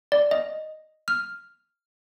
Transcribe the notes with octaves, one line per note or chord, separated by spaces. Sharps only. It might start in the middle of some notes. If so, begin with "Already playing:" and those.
D5
D#5
F6